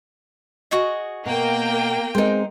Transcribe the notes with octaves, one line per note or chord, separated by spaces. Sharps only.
F#4 G#4 D#5
B2 A#3 G5
G#3 C4 D#4 A#4 C5